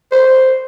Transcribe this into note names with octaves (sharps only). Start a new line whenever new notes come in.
C5